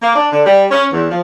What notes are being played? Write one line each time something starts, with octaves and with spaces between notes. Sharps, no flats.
A#3
D4
D3
G3
C#4
E2
F3